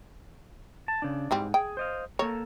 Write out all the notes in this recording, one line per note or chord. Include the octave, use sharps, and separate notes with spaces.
A5
C#3 D4
G#2 E3 G3 C4
G#4 G5
C5 D#5 F5
A#3 A4 C#5 A#5